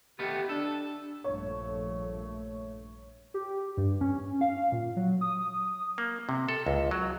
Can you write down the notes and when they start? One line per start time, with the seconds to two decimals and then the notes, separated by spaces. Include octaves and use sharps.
0.19 D#3 A3 B3 G4
0.49 D4 A4
1.24 A#1 G2 A3 C#5
3.34 G4
3.77 G2
4.01 C#4
4.41 F5
4.72 A#2
4.96 F#3
5.21 D#6
5.98 A#3
6.29 C3
6.49 A4
6.66 C#2
6.91 F#3